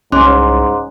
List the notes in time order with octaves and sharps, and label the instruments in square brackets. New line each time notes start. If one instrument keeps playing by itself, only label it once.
[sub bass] C2 [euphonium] G#2 [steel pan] C#4 [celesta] C6 D6 F#6